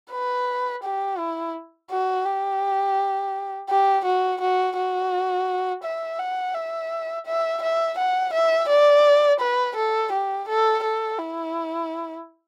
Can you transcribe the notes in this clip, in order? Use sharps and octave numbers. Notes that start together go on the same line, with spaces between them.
B4
G4
E4
F#4
G4
G4
F#4
F#4
F#4
E5
F#5
E5
E5
E5
F#5
E5
D5
B4
A4
G4
A4
A4
E4